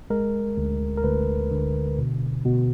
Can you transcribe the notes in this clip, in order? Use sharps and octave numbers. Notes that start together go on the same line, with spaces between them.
G#3 A#4
D2
A#4
D2 B4
D3
B2
B2